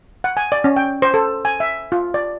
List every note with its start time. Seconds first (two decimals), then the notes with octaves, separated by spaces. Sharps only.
0.24 F#5
0.37 G#5
0.52 D5
0.64 C#4
0.76 G5
1.02 C5
1.14 A4
1.45 G#5
1.60 E5
1.92 F4
2.14 D5